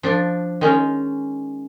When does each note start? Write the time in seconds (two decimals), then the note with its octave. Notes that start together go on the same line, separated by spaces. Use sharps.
0.03 F3 D4
0.61 D#3 G#3 C#4